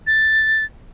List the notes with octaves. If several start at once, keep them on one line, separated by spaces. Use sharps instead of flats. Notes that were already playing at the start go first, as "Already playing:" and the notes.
A6